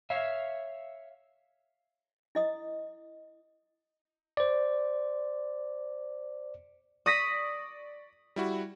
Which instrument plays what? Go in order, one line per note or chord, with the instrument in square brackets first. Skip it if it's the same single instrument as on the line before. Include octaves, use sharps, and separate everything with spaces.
[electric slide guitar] C#5 E5 F5
[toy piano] E4 D#5 D#6
[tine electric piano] C5 D5
[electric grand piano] D5 C#6 [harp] D#6 A#6 B6
[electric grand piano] G3 E4 F#4